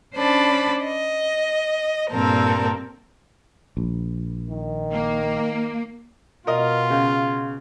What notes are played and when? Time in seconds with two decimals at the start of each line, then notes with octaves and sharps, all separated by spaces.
0.15 C#4 D4 C5 D5 A5 B5
0.84 D#5
2.10 G2 A#2 C4 A4 A#4
3.77 A#1
4.49 D#3
4.92 A#3
6.47 B2 F4 A#4 D#5
6.90 C#3